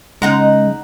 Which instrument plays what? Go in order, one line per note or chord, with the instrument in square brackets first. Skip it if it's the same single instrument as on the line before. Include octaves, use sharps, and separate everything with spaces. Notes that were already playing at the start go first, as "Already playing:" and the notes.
[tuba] C#3 [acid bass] G#3 [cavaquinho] D#4 F#5 A#5